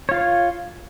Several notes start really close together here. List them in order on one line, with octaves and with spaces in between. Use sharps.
C#5 F4 F5